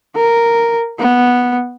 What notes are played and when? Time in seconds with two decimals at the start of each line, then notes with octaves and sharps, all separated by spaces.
0.16 A#4
0.99 B3